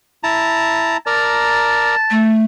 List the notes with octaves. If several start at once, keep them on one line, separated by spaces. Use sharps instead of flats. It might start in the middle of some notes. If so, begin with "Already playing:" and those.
E4 A5 A#5
A#4 D5 A5 A#5
A3